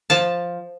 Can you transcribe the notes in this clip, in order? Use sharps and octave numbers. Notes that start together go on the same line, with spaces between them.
F3 A5